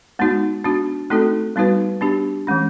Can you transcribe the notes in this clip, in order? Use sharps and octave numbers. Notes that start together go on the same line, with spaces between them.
G#3 B3 D#4 F#4
B3 D4 F#4
A3 C4 D#4 F#4 A4
G3 B3 D#4 F#4 B4
B3 D4 G4
E3 G#3 C#4